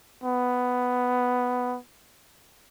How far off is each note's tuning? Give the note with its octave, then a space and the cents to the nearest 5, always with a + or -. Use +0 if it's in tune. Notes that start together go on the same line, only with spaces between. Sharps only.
B3 +5